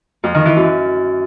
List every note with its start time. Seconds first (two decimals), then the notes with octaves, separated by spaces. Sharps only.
0.24 F2
0.34 D#3
0.45 E3
0.56 F#2